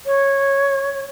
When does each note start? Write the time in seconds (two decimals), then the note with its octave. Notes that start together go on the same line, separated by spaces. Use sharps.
0.06 C#5